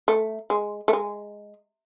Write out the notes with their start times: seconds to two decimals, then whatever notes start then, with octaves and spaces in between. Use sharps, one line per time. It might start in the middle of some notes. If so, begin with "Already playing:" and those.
0.08 A3
0.50 G#3
0.88 A3
0.93 G#3